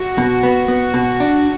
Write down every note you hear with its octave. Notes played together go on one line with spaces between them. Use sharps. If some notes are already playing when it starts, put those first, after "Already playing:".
Already playing: F#4
B2
B3
B3
B2
D4